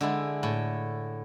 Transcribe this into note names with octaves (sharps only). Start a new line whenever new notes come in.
D3 G#3 E4
A2